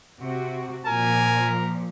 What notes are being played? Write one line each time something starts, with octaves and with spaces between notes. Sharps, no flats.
C3 F#4
A#2 F3 A#4 G#5